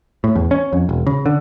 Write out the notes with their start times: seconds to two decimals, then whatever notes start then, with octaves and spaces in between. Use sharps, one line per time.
0.24 A2
0.36 E2
0.51 C#4
0.73 F2
0.89 E1
1.07 C#3
1.26 D3